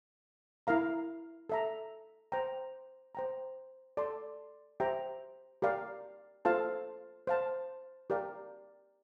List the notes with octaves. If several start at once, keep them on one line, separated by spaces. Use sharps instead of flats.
E4 A#4 F5 A#5
A4 E5 A#5
C5 G5 A#5
C5 G5 A#5
A4 D5 A5 C6
G4 C5 E5 G5 A#5
G4 A#4 D5 F5
F4 A4 C5 F5 A5
C5 F5 A5
G4 A#4 D5 F5